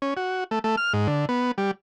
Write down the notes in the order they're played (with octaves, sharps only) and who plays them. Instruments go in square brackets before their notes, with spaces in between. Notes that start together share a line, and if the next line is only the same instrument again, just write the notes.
[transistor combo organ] C#4
F#4
A3
A3
F6
G#2
D3
B3
G3